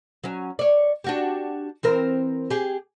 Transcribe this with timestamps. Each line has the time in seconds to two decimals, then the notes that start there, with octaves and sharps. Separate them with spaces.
0.24 F#3 C#4
0.59 C#5 D5
1.04 D4 F#4 G4
1.83 E3 C4 A#4
2.50 G4 G#4